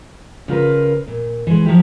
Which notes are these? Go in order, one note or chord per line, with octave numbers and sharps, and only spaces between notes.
C#3 F4 A#4 B4
A#2
E3 G#3
F3 F#3 E4 G4